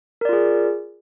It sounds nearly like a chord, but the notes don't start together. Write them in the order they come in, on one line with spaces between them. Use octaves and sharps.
A#4 D5 F4 G#4